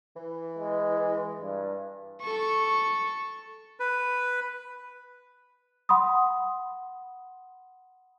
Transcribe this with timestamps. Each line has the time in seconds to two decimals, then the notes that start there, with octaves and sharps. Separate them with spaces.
0.16 E3
0.59 G#3
1.40 G2
2.22 A4 C#6
3.80 B4
5.89 F#5 B5 C6 D#6